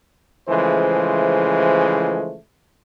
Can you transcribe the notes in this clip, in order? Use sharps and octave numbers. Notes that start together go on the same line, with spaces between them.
C#3 E3 F3 G#3 A3 C5